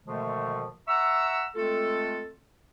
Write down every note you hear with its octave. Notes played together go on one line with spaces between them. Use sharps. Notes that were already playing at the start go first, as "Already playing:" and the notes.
B2 D3 D#3 F3 G#3 A3
E5 F#5 A#5 C#6 E6
G#3 A3 C4 F4 A4